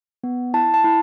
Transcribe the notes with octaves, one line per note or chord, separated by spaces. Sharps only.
B3
E4 A5
A5
E4